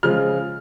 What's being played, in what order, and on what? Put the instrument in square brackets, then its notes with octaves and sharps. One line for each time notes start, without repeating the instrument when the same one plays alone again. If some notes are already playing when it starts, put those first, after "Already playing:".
[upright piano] C#3 F3 G#3 F6